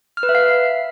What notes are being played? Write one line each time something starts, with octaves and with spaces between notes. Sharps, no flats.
F6
B4
E5
F5